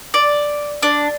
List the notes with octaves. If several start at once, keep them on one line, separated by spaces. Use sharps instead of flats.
D5
D4